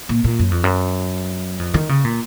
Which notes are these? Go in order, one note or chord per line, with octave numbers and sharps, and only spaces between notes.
A#2
A#2
F#2
F2
F#2
F2
D#3
C#3
A#2